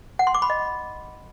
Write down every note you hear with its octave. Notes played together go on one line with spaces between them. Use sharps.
F#5
C6
D6
B5
D#5